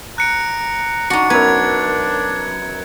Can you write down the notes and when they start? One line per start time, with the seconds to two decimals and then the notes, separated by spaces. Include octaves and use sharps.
0.18 A#5 F#6 C#7 D7
1.10 D4 D#4 F#4 C#7
1.30 F#2 B3 B4 A#5 G#6